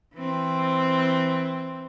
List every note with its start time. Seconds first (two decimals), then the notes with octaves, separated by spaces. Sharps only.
0.15 E3 C4